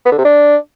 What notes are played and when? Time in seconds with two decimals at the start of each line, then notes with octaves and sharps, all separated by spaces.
0.05 B3
0.12 D3
0.18 C3
0.25 D4